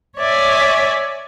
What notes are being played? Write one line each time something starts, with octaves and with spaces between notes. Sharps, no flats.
C#5 D5 E5 G#5